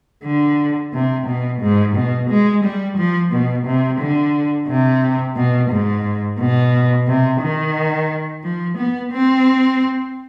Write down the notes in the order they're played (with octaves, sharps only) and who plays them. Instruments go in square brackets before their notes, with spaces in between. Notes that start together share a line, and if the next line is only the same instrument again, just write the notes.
[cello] D3
C3
B2
G#2
B2
G#3
G3
F3
B2
C3
D3
C3
B2
G#2
B2
C3
D#3
F3
B3
C4